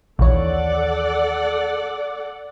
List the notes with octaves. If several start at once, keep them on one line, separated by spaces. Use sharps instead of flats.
A#1 D#2 E3 A4 C#5 D5 F#5